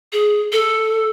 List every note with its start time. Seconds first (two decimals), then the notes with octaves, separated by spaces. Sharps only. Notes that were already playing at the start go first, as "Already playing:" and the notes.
0.13 G#4
0.52 A4